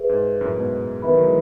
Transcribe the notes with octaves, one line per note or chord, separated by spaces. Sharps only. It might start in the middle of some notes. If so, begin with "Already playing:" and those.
Already playing: G#4 B4 E5
G#2
F#2 A2
G#2 B2
B2 D#3 B4 E5 B5
D#3 F#3
E3 G#3